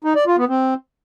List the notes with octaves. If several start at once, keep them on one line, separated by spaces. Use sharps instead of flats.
D#4
D5
F4
B3
C4